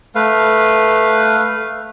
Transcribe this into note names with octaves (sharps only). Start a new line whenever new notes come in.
A3 B4 F5